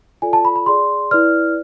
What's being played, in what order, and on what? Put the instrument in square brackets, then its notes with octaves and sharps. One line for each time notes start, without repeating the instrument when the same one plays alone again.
[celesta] F4 A4 D5 G#5
A5
B5
B5
G#4 D5 C6
E4 B4 D5 F6